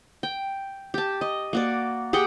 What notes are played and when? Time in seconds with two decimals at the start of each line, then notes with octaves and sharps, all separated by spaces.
0.23 G5
0.94 G4 A5
1.21 D#5
1.53 A#3 F#4 D5
2.13 G4 G#4 F#5 G5